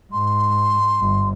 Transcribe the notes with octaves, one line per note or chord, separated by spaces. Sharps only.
G#2 C6
G1